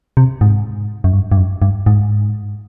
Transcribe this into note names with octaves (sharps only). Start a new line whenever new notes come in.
C3
G#2
F#2
G2
G2
F#2
G2
G#2